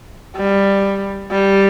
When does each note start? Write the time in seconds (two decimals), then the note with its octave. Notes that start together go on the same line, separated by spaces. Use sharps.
0.36 G3
1.32 G3